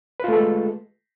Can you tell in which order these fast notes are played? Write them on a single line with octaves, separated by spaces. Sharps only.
B4 F4 A3 A4 G#3